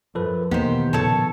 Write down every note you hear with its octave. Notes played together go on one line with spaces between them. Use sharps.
F#2 F3 A4 B4
E2 B2 D#3 A#3 B3 D#4 G4 C5
A#2 C#3 F3 A4 C#5 A5